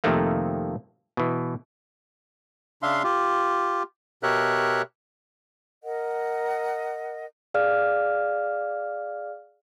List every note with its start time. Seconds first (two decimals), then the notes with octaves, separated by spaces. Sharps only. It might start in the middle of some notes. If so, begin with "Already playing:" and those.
0.04 F2 C3 D#3 A3 A#3
1.17 B2 E3
2.82 C#3 D4 E5 F5 C6
3.03 F4 G4
4.23 B2 G4 A#4 C#5 E5 F#6
5.84 A#4 D#5 F#5
7.54 G#4 D5 F5 F6